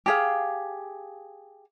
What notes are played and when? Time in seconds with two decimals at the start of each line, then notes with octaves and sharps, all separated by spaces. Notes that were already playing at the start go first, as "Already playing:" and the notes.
0.06 G4 G#4 F5